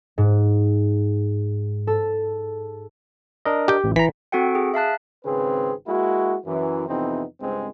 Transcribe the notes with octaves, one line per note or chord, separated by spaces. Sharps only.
G#2
A4
D4 A#4 D#5
G4 G5
A1
E3 A#5 B6
C4 F#4 A4 F#5 G5
G#4
E5 F5 A5 F#6
G#1 C#3 C4 G#4 B4
G#3 A#3 E4 F#4
F#2 E3
F2 C3 E3 B3 C4 D#4
C#2 G2 G#3 C4